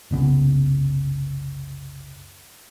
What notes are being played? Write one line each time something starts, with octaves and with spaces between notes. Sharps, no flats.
F#1 C2 C#3 B3